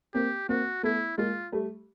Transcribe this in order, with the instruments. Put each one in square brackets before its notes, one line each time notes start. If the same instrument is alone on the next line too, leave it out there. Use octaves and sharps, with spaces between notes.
[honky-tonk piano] A#3 C4 [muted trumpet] G4
[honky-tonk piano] A#3 C4 [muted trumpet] F#4
[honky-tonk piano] A3 B3 [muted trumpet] E4
[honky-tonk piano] G#3 A#3 [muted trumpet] F4
[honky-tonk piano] G3 A3